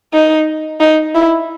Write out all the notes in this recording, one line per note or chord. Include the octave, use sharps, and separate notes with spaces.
D#4
D#4
E4